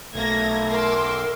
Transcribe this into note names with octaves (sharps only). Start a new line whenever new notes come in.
B1 A3 A#3 G#6 A#6
A#4 C6 D6 E6